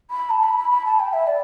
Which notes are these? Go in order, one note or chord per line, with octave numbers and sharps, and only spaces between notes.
B5
A5
B5
B5
B5
A5
G5
E5
D5